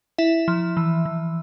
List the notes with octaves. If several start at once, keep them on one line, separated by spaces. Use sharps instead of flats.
E4 E5
F3
E3
E3